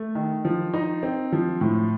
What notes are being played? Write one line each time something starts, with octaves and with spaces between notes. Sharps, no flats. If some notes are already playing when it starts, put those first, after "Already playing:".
Already playing: A3
D#3
F3
D#4
C4
F3
A2